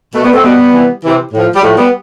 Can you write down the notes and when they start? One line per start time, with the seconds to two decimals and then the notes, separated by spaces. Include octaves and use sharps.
0.14 B2 A3
0.23 G3 B3
0.33 A3 C4
0.43 B2 G3 B3
0.73 C3 E3
1.03 C3 E3
1.33 A2 F3
1.55 G3
1.62 A2 F3 A3
1.77 G3 B3